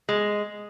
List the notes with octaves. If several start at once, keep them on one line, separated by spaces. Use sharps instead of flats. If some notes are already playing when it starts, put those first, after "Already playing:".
G#3